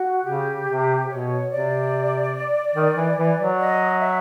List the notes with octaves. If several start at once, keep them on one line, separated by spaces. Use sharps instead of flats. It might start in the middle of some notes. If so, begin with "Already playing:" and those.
Already playing: F#4
C#3 G4
C3
B2 C#5
C3 D5
D#3
E3
E3
F#3
D#5
E5